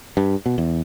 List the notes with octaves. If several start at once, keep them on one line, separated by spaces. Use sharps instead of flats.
G2
B2
E2